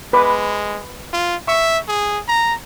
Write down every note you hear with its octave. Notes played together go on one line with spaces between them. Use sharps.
G#3 B4 B5 D6
F4
E5 C#6
G#4
A#5